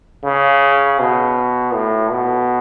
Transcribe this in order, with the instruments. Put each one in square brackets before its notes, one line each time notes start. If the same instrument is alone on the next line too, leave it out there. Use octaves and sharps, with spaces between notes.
[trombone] C#3
B2
A2
B2